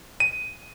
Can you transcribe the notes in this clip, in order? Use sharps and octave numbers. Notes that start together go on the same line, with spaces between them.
D#7